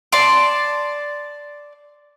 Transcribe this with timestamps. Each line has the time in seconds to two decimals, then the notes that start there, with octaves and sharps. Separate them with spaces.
0.12 D5 A5 C6 D6